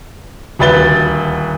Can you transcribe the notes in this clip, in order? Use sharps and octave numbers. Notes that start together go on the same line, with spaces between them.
D#1 D2 B4 A6 G7